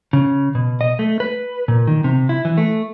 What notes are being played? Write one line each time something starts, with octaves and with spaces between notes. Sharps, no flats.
C#3
B2
D#5
A3
B4
A#2
D#3
C3
E4
E3
A3